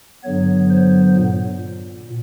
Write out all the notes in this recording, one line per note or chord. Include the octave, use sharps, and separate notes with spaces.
G2 D3 F#3 B3 C#5
C5
A#2